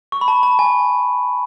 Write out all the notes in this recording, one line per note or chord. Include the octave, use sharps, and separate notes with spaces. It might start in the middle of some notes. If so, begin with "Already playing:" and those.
C#6
B5
A5
A5
G#5